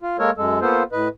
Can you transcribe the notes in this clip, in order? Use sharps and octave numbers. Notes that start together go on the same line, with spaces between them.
F4
G#3 A#3 A4 A#4 C#5
F#2 G#3 A4
A#3 B3 F4 A4 C5
A2 B4 D#5